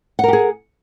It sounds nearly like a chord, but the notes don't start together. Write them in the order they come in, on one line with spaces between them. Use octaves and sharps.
F#5 A#4 G4 G#4